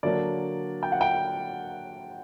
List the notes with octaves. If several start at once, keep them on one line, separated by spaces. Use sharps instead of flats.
D3 F#3 A#3 D4 D5
G5
F#5
G5